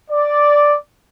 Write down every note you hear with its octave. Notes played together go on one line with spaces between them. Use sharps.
D5